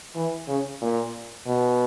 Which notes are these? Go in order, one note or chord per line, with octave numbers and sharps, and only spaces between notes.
E3
C#3
A#2
B2